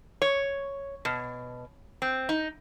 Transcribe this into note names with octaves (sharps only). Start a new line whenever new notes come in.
C#5
B2
C4
D#4